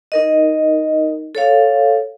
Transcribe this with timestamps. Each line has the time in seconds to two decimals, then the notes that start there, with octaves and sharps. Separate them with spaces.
0.12 D#4 A#4 D#5
1.35 A4 C#5 F5